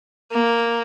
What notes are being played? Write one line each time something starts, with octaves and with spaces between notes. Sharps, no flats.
A#3